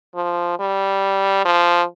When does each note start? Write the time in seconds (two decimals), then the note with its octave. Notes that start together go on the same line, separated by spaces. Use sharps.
0.15 F3
0.59 G3
1.45 F3